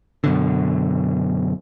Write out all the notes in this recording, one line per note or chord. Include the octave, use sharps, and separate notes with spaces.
F#2 B2 D3